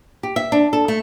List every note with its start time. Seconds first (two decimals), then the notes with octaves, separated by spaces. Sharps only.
0.23 G4
0.36 E5
0.52 D4
0.73 A4
0.88 A3